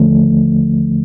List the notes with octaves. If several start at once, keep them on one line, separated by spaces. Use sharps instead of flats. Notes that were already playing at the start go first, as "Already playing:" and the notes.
Already playing: D#2 D3 F3 A3